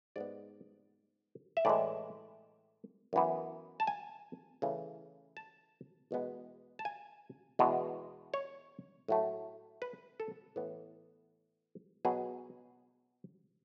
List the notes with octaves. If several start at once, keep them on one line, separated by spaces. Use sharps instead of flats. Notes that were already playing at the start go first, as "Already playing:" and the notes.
G#2 G#3 B3 D5
E5
A2 E3 G#3 D5
F#2 E3 B3
A5
G#5
C#3 E3 A3
A5
E2 B2 G#3 B3
A5
G#5
E2 B2 G#3
C#5
A2 F#3 A3
B4
A4
A2 E3 B3
B2 F#3 B3 G#4